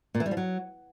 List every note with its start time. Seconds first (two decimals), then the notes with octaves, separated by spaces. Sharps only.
0.15 A#2
0.20 E3
0.26 G3
0.31 F3
0.37 F#3